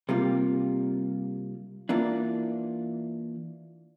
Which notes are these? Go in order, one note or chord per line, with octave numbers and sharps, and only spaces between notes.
C3 G3 A#3 F4
E3 A#3 D4 F4